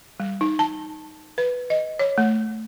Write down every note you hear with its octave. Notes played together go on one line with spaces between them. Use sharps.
G3
D#4
A5
B4
D#5
C#5
A3